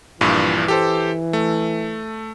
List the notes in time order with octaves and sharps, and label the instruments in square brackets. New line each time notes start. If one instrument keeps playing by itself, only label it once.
[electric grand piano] A#1 G2 A#2 [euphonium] E3
[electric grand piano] G4 A4 C5
A3